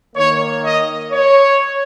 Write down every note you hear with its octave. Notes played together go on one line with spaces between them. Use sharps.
D#3 A#3 C#5
D#5
C#5